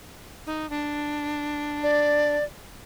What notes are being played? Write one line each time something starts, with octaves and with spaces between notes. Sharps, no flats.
D#4
D4
D5